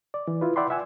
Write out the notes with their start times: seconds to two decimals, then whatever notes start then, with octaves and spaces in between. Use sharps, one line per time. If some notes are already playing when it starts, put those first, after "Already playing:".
0.14 D5
0.28 E3
0.41 E4 F4 B4
0.56 D5 E5 F#5 G5 B5 C6
0.70 E5 F#5 G#5 E6